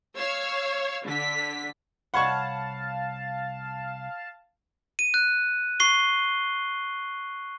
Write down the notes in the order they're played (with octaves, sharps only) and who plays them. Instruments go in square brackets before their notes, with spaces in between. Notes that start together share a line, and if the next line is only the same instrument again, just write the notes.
[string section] C#5 F5 E6
D3 B6
[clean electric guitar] C2 C#5 B5 [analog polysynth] F5 A5 [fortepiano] F#5 C#6
[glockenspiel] D#7
F#6
C#6 C7 G7